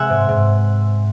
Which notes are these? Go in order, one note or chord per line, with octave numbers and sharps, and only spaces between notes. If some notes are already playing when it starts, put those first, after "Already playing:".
Already playing: C3 G#3 E5 F#5 G#5
G#2
G#2